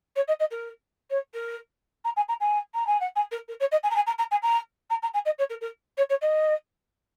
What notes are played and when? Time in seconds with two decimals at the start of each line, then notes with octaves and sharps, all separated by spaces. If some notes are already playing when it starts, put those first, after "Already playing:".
0.16 C#5
0.28 D#5
0.40 D#5
0.51 A#4
1.10 C#5
1.34 A#4
2.05 A#5
2.17 G#5
2.29 A#5
2.41 G#5
2.75 A#5
2.87 G#5
3.01 F#5
3.16 G#5
3.32 A#4
3.49 A#4
3.60 C#5
3.72 D#5
3.83 G#5
3.91 A#5
3.96 G#5
4.07 A#5
4.19 A#5
4.31 G#5
4.43 A#5
4.90 A#5
5.03 A#5
5.14 G#5
5.25 D#5
5.39 C#5
5.50 A#4
5.61 A#4
5.97 C#5
6.10 C#5
6.22 D#5